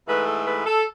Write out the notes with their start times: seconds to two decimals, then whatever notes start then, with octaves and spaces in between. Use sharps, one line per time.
0.08 G#2 E3 A3 B4
0.27 A4
0.47 B4
0.66 A4